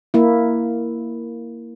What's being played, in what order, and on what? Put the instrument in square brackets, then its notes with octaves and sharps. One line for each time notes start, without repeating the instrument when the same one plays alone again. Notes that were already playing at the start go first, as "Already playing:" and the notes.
[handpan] A#3 E4